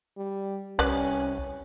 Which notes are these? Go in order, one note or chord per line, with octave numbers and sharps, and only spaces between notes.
G3
C2 C#4 B4 D5